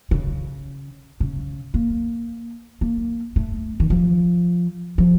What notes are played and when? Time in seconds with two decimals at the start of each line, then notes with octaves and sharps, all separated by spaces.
0.11 C#3
1.20 C#3
1.74 A#3
2.81 A#3
3.36 A3
3.80 D#3
3.90 F3
4.98 F3